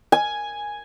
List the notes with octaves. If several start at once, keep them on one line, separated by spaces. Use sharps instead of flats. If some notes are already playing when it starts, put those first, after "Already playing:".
G#5